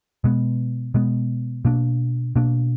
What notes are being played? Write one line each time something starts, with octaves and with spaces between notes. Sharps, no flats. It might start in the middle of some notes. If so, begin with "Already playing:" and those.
B2 G#3 B3
B2 G#3 B3
B2 A#3 D4
B2 A#3 D4